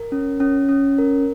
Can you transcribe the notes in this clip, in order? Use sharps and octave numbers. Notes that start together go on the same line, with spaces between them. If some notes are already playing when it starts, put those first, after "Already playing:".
Already playing: A#4
C#4
C#4
C#4
A#4